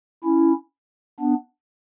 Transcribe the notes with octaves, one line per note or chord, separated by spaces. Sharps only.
C#4 E4
B3 D4